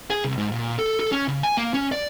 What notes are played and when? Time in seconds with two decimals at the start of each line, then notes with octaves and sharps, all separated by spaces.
0.10 G#4
0.24 C2
0.38 G#2
0.52 A#2
0.79 A4
1.00 A4
1.12 C#4
1.28 C#3
1.43 G#5
1.57 A#3
1.74 C#4
1.92 D5